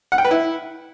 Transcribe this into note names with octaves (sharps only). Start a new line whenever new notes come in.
F#5
G5
B4
E4